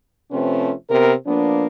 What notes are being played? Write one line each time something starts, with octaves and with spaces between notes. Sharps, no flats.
C3 F3 A3 C4 C#4 B4
C3 B3 A#4
F3 A#3 B3 D4